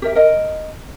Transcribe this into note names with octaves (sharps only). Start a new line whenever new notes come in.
G4 A#4 E5
A#4 D#5